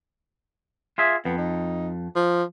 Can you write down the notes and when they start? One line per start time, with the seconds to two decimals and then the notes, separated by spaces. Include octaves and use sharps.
0.98 F4 G#4 E5
1.25 F2 B3
1.38 D#4
2.16 F3